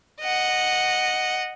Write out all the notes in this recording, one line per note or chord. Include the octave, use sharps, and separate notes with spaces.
D#5 F#5